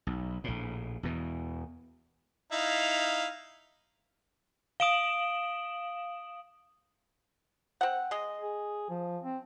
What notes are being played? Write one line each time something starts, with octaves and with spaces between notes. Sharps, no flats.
B1
A#1 A2
E2 B2 E3
D#4 E4 F5
F5 D#6 D7 E7 F#7 G7
C4 F#5
G#3 D#5
G#4
F3
C4